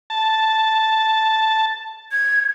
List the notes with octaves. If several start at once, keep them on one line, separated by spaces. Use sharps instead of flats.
A5
G#6